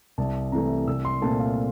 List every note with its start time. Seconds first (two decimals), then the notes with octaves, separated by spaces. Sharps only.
0.18 C2 A5
0.52 C3 E3 A3 A#5
0.87 C2 E6
1.05 C6
1.22 A#2 A3 C4 A5
1.39 F5